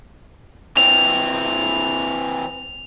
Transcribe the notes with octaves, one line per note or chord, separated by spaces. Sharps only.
E3 C4 F7